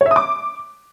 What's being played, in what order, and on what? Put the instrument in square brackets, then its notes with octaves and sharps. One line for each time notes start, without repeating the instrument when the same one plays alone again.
[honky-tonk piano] C#5
E5
D#6
D6